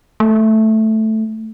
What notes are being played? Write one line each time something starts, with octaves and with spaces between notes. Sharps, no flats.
A3